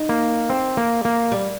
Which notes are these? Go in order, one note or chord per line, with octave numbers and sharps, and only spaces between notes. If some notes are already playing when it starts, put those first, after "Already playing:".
Already playing: D#4
A#3
C4
A#3
A#3
G3